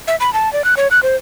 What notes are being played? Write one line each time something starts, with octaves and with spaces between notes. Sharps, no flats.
E5
B5
A5
D5
F#6
C#5
F#6
C5